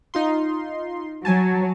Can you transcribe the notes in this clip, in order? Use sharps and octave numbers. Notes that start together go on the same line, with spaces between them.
D#4 F4 C6
F#3 G#5 A5